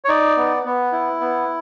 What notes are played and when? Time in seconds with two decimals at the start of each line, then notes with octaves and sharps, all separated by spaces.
0.05 C#5
0.09 D#4 D5
0.37 B3
0.65 B3
0.92 E4
1.20 B3